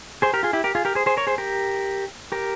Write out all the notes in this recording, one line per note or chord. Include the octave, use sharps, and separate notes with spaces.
G#4 C5
G4 A#4
F4 G#4
E4 G4
G4 A#4
F4 G#4
G4 A#4
G#4 C5
G#4 C5
A#4 C#5
G#4 C5
G4 A#4
G4 A#4